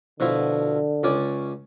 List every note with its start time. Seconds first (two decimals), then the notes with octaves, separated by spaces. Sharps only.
0.20 B2 D3 F3 E4
1.03 C#2 C#4 D5